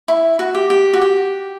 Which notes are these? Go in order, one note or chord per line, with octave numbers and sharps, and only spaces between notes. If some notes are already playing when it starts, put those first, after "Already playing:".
E4
F#4
G4
G4
F#4
G4